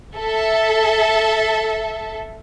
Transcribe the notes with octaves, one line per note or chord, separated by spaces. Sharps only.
A4 E5